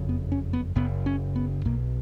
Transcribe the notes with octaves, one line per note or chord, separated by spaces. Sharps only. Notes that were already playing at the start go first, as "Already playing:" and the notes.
Already playing: F#1 F2 C#3
B3
C#4
B3
F#1 F#2 C#3 B3
C#4
B3
B1 B2 A#3